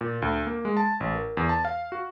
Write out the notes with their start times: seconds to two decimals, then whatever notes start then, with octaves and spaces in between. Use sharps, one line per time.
0.01 A#2
0.22 D2
0.47 A#3
0.65 G#3
0.77 A5
1.00 A1
1.15 A#4
1.37 E2
1.49 A5
1.65 F5
1.92 F#4